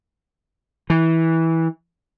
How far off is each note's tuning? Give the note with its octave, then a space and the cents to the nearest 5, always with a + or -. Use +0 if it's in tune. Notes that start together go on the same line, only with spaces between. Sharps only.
E3 -15